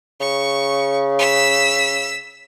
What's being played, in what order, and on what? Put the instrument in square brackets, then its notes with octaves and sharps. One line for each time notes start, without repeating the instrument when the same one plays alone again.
[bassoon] C#3 [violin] C#6
[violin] E6 B6